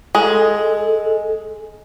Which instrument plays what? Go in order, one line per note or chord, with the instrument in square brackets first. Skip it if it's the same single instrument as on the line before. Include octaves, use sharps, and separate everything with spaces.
[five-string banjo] G#3 [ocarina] A4